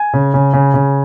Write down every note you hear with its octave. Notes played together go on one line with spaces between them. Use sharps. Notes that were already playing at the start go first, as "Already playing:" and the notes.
Already playing: G#5
C#3
C#3
C#3
C#3